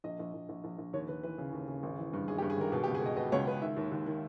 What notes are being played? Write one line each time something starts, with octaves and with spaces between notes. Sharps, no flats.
A#1 D#5
A#1
A#1
A#1
A#1
A#1
D#2 C#5
D#2 B4
E3 B4
C#3
D#2
C#3
G#1
E3
G2
G#1 G#4
G4
G2
G#4
G#1 A#4
B2 G#4
G4
C#2
G#4
B2 D#5
B2 D#5
C#2 C#5
C#2 B4
D#3 E5
D#2
D#2
D#3